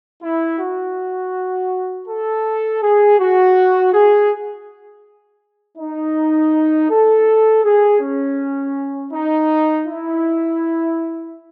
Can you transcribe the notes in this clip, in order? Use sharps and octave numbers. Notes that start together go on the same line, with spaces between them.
E4
F#4
A4
G#4
F#4
G#4
D#4
A4
G#4
C#4
D#4
E4